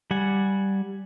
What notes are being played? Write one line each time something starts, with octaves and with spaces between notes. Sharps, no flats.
G3 F#5 G#5